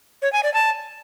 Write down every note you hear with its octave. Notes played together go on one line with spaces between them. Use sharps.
C#5
G#5
D5
A5